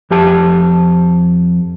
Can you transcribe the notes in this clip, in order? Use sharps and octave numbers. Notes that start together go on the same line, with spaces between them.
F2 G4 A5